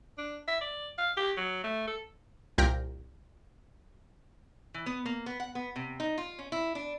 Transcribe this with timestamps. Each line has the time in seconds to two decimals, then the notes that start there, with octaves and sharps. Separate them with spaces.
0.18 D4
0.48 E5
0.61 D5
0.98 F5
1.17 G4
1.37 F#3
1.64 A3
1.87 A4
2.58 C2 A#2 G5 F6 G6 A#6
4.74 E3
4.86 B3
5.06 A#3
5.26 B3
5.40 F#5
5.55 B3
5.76 C3
6.00 D#4
6.18 F4
6.39 C#4
6.52 E4
6.75 D4